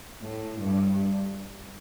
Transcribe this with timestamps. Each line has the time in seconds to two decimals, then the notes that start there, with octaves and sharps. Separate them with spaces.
0.23 A2
0.59 G2